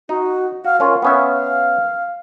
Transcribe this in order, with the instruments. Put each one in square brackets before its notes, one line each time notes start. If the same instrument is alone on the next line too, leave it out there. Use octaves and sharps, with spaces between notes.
[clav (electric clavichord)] D#4 [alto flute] F#4
[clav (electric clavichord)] F#4 [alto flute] F5
[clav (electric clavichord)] C#4 F4 [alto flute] A#4
[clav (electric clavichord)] B3 C#4 E5 [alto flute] F5